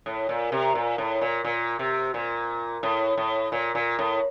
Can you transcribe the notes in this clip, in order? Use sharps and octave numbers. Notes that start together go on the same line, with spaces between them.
A2
A#2
C3
A#2
A2
A#2
A#2
C3
A#2
A2
A2
A#2
A#2
A2